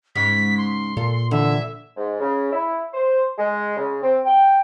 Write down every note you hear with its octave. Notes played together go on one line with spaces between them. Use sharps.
G#2 C#3 G#3 B6
C6
A#2 A4
D3 E3 E5
G#2
C#3
E4
C5
G#3
C#3
C4
G5